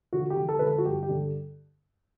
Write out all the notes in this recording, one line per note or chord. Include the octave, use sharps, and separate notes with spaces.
D3 F#4
G4
D3
A4
D3 B4
A4
F#4
G2 G4
G4
D3